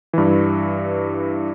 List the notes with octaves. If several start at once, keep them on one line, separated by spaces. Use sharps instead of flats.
G2 E3